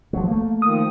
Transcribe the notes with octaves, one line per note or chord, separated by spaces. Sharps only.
F3 F#3
A3 A#3
D#3 F3 D#6